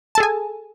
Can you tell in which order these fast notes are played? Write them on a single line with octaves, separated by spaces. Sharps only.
A5 A4 G#4 G#5